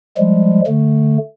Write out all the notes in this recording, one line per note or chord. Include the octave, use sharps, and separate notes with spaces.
F3 G3 G#3
D3 A3